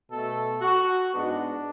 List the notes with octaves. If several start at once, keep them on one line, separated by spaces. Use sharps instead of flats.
B2 A3 A4
F#4
G#2 G#3 B3 D4